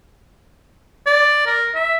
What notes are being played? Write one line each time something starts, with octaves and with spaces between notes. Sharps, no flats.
D5
A#4
E5